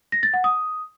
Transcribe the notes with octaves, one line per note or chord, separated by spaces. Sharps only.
A#6
A6
F#5
D#6